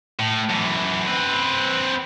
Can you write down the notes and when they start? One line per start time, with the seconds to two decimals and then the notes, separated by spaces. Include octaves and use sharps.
0.19 A2
0.50 F#2 E3
1.08 C4 B4